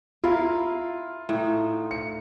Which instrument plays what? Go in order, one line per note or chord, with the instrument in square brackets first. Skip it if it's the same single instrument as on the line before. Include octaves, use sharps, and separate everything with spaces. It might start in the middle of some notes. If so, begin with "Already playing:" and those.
[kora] E4 A#4 F5 [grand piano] F4
[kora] A2 D#4
[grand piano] C#7